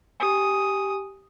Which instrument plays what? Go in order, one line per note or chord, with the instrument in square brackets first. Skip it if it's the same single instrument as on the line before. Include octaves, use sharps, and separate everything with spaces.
[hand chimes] G4 G#5 [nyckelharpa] D#6